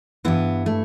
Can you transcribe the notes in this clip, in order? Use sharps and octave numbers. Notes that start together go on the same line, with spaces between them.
G2 E3 B3
A3